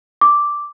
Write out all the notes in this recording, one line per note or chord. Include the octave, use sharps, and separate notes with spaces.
D6